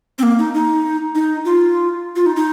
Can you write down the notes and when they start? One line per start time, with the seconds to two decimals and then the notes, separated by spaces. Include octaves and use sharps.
0.19 C4
0.23 A#3
0.39 D#4
0.54 D#4
1.15 D#4
1.45 F4
2.16 F4
2.26 D#4
2.36 D#4